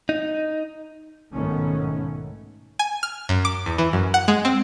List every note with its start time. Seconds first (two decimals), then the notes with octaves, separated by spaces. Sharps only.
0.09 D#4
1.33 B1 G#2 D#3 A3 B3 C#4
2.79 G#5
3.03 F6
3.29 F#2
3.45 D6
3.66 E2
3.78 E3
3.93 F#2
4.14 F#5
4.28 G#3
4.45 C4